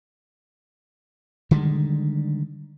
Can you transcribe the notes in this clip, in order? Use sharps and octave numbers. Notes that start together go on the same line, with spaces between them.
D3 D#3 G3 G#3